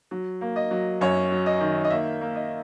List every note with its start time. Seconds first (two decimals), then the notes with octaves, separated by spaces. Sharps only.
0.11 F#3
0.41 A#3
0.56 D#5
0.71 F#3
1.01 F#2 C#5
1.32 F#3
1.46 D#5
1.60 D#3
1.84 D#5
1.90 A#3 E5
2.21 A#3
2.36 D#5